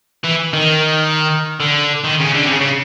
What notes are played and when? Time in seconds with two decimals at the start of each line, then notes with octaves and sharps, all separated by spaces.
0.24 E3
0.53 D#3
1.60 D3
2.04 D#3
2.20 C#3
2.35 D3
2.45 C3
2.50 C#3
2.61 C#3